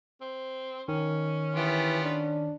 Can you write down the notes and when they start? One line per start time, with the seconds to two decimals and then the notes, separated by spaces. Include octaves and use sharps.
0.21 C4
0.88 D#3 C#4
1.55 E3 B3 F4 G4
2.04 D4